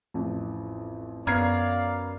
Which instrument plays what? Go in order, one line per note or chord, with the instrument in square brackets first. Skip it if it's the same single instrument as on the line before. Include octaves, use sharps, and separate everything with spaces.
[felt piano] A1 F2
[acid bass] F#2 [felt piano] B3 C7 [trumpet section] D5 F5 [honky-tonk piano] A#5 F6 G#6